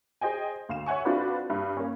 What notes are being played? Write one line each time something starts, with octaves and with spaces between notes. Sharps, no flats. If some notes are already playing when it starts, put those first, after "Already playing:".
G#4 C5 D#5 G5 G#5
D2 F5 E7
C#5 E5 F#5 G#5 C#6
C4 D4 F4 F#4 A4 B4
G2
A#3 C#4